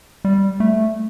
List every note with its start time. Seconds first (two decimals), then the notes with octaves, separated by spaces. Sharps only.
0.25 G3
0.60 A3